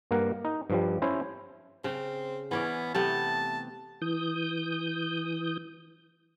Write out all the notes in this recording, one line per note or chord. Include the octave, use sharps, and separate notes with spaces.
G2 A#3 A#4 F#5
D#4
G2 F3 G3
C#4 E4 C5
C#3 C4
E3 B3 C#4 D5
C3 A3 B3 A5
E3 D#6 G6